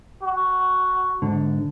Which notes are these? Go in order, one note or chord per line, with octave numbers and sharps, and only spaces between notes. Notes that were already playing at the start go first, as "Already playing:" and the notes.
F#4
G#2 D3